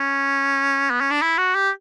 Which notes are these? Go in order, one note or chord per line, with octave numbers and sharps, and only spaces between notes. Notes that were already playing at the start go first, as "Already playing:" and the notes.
Already playing: C#4
B3
C#4
D4
E4
F#4
G4